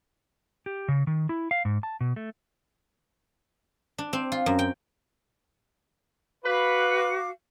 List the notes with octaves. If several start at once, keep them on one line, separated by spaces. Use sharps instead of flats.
G4
C#3
D#3
E4
F5
G#2
A5
B2
A3
D4
C4
F4
F#2
G5
F#4 B4 F5 D6